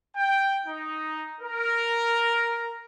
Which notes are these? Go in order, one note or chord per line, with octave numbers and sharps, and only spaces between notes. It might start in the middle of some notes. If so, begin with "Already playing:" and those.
G5
D#4
A#4